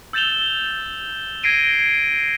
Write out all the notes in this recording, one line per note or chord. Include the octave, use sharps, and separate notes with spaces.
E6 G6 A6 E7 F7 G7
G#6 A#6 C7 D7 D#7 G7